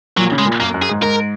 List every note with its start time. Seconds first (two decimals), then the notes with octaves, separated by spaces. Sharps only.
0.17 A#2 F#3
0.32 C#3
0.38 G#3
0.45 A#2
0.60 F#2 A#3
0.74 F#2
0.82 G#4
0.89 G#2
1.03 G#2 A#4